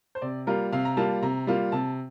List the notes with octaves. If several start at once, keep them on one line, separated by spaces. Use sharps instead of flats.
C5
C3 D5
G3 A#3 F4 A#4
C3 F5
A#5
G3 A#3 F4 A5
C3 A#5
G3 A#3 F4
C3 A5